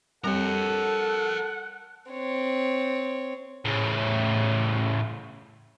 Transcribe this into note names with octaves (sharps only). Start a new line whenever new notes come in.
G3 C4 G4 A4 A#4 C#5 F#5
C4 C#5
A2 C#3